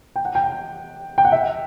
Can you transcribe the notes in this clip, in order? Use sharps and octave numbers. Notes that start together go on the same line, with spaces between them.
G5
F#5
G5
G5
F#5
E5